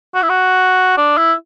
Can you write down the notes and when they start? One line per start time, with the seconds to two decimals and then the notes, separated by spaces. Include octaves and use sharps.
0.14 F#4
0.22 E4
0.29 F#4
0.97 D4
1.17 E4